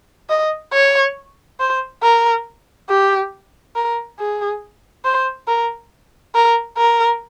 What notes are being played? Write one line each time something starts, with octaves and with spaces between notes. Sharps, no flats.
D#5
C#5
C5
A#4
G4
A#4
G#4
C5
A#4
A#4
A#4